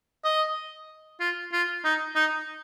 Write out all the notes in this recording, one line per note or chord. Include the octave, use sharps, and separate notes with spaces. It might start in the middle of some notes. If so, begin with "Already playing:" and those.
D#5
F4
F4
D#4
D#4